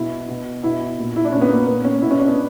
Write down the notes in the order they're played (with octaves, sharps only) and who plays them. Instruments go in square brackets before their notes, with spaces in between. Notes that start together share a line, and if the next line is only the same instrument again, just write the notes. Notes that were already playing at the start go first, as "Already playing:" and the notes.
Already playing: [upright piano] B2 E4
B2
B2 E4
A#2
E4
D4
A#2 C#4
B3
A#3
A#2 B3
C#4
B2 E4
C#4
D4
B3